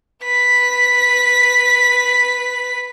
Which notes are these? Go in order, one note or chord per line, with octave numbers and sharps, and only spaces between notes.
B4 B6